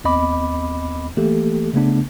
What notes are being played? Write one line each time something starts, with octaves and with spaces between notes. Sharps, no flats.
D#2 B3 C4 D#5 B5 D6
E3 A3 A#3 G4 A4
C#3 A3 B3 D4